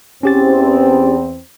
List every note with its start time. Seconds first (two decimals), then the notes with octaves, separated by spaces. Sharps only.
0.23 E2 C4 C#4 G4 A6